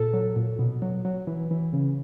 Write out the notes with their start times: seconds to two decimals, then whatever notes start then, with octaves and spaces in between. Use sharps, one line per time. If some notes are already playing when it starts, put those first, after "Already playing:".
Already playing: A#2 A4
0.14 F#3
0.36 A#2
0.59 B2
0.82 F#3
1.05 F#3
1.27 E3
1.51 E3
1.73 C#3